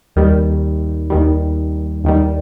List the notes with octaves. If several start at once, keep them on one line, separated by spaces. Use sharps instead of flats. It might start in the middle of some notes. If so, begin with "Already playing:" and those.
D#2 D#3 G3
D#2 D#3 G3
D#2 D#3 G3